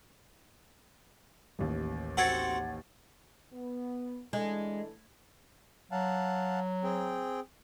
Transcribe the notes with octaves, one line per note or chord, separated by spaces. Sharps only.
A1 D#2
C4 F#4 A4 F#5 G#6 A6
B3
E3 G#3 D4 A4
F#3 F5 F#5 A5
C4 G#4 G5